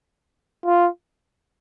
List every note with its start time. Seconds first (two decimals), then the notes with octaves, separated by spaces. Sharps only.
0.66 F4